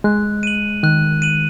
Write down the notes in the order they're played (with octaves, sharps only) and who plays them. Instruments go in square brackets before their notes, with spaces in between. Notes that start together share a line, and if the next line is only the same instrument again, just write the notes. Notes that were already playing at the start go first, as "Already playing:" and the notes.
[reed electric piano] G#3 [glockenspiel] F#6
[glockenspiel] D#7 F#7
[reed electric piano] D#3 [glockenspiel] F#6
[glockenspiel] D#7 F#7